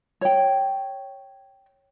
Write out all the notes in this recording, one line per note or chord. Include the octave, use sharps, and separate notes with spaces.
C#5 G5